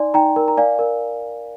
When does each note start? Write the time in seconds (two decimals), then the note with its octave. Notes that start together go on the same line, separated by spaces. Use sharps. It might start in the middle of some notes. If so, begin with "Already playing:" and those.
Already playing: D#4 D5 G#5 C6
0.14 D#4 G5 A#5
0.36 A#4
0.48 A#5
0.57 D5 F5 G#5
0.79 A#4